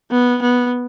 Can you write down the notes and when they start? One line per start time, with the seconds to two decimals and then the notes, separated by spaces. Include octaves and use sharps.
0.11 B3
0.42 B3